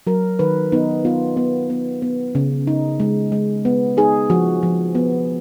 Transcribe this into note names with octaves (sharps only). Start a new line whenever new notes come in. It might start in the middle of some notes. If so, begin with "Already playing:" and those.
F#3 A#4
D#3 B4
B3 D#4
B3 F4
B3
B3
B3
C#3
D#4
G#3
G#3
B3
D#4 G#4
F3 F#4
F3
B3